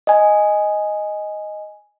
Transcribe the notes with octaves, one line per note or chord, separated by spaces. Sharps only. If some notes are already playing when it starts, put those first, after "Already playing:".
D#5 G#5